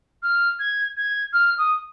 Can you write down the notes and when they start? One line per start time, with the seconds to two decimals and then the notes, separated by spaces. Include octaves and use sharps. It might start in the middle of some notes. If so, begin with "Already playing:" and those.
0.23 F6
0.59 G#6
0.97 G#6
1.33 F6
1.58 D#6